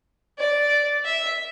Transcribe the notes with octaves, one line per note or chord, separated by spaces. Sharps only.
D5
E5